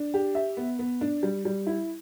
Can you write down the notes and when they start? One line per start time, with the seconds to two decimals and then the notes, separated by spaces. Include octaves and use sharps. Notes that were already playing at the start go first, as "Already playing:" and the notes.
Already playing: D4
0.14 G4
0.35 E5
0.57 B3
0.79 B3
1.01 D4
1.23 G3
1.45 G3
1.67 E4